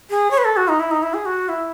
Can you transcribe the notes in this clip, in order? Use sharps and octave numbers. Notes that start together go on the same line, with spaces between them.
G#4
C#5
B4
A4
F#4
D#4
E4
D#4
E4
G#4
F#4
E4